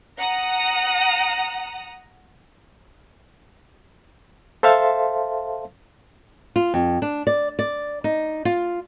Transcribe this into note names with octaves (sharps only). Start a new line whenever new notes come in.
F#5 A#5 D#6
A4 C5 E5 F5 A5 C6
F4
F2
D4
D5
D5
D#4
F4